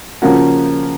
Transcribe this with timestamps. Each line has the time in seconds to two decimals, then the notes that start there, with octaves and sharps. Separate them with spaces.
0.22 C#3 F3 A#3 C#4 F#4